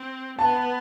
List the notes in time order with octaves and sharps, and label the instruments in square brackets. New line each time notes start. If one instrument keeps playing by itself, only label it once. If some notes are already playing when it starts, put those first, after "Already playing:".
Already playing: [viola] C4
[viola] B3 [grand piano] A5